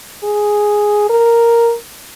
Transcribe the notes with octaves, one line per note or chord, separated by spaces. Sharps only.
G#4
A#4